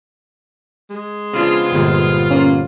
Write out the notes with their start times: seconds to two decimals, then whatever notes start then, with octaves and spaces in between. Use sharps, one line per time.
0.90 G#3
1.34 C#3 B3 C4 D4 F4
1.72 G1 A#2 G#3
2.31 A#3 C#4